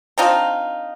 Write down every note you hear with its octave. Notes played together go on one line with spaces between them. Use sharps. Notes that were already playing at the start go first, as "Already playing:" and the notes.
C4 D4 D#4 F4